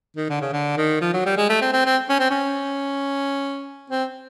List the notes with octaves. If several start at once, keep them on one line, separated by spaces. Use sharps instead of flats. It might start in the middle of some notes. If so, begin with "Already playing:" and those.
D#3
D3
C#3
D3
D#3
F3
F#3
G3
G#3
A3
C4
C4
C4
C#4
C4
C#4
C4